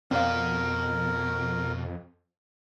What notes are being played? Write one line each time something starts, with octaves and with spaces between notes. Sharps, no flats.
F2 B2 C4 A#4 D5 F5